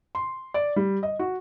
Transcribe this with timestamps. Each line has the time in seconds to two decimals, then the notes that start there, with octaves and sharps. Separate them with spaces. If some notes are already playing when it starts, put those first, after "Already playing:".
0.15 C6
0.54 D5
0.76 G3
1.03 D#5
1.19 F#4